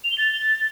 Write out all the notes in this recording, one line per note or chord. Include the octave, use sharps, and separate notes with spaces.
F7
G7
A6